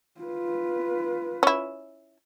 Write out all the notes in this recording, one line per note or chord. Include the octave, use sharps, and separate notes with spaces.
F4 B4
C#4 E4